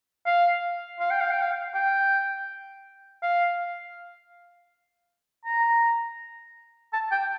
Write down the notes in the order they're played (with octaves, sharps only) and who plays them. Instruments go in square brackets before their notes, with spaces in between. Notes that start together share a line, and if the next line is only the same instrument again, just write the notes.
[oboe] F5
F5
G5
F5
G5
F5
G5
F5
A#5
A5
G5